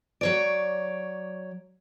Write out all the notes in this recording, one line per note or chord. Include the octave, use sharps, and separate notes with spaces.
F#3 C#5 D5